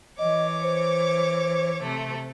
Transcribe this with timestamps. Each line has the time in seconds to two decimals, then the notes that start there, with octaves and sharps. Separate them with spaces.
0.19 E3 C#5 D#5 D6
0.63 C5
1.82 C3 A3